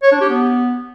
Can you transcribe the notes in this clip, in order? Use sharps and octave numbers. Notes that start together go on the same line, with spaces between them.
C#5
D4
G4
B3